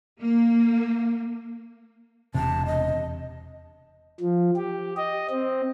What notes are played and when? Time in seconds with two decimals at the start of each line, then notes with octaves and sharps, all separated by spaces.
0.22 A#3
2.34 E1 C3 A5
2.66 D#5
4.20 F3
4.56 G4
4.97 D#5
5.30 C4